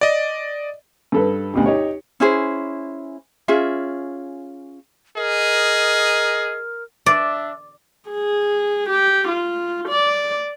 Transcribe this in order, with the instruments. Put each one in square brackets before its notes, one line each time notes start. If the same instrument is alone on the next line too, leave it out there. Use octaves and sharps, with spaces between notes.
[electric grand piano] D5 D#5
[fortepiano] G2 A4 B4
D2 B2 G3
D#4 G4 C#5
[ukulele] C#4 E4 G#4 C5
C#4 F4 G#4 E5
[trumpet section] G#4 D#5 [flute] A#4
[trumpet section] D4 E5 [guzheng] D5
[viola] G#4
G4
F4
D5